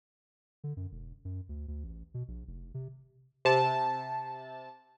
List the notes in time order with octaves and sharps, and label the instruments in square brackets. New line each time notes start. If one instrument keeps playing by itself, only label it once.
[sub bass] D3
F#2
E1
F#2
D2
D2
A1
B2
A#1
F1
C3
[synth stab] C3 A5